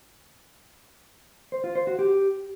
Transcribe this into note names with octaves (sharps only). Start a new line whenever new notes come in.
C5
F4
C5
F#4
G4